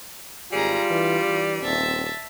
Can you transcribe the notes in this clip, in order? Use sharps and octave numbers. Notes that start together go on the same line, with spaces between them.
G#1 G3 F4 G#4 A#5
E3 D4
E3
D#1 C4 E5 A5